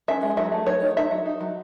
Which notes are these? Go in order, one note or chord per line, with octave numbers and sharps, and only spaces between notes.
C#4 E5
G#3
F#3 E5
A3
F#3 C#5
D#4
D#4 E5
F#3
D#4
F#3